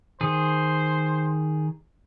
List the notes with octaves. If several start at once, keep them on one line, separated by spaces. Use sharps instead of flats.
D#3 G#4 C5